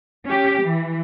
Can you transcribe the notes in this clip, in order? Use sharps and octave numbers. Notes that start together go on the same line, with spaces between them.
C#4 G4
E3